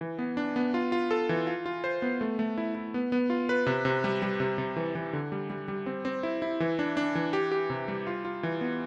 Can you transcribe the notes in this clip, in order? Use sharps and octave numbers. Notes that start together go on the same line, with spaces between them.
E3
B3
D4
B3
F4
F4
A4
E3
F4
F4
C5
B3
A3
A3
E4
E4
B3
B3
F4
B4
C3
C3
G3
G3
C3
C3
E3
E3
D3
G3
G3
G3
C4
C4
E4
E4
E3
D4
D4
E3
G4
G4
C3
G3
F4
F4
E3
B3